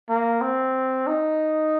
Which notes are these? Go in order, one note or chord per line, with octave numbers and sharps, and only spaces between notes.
A#3
C4
D#4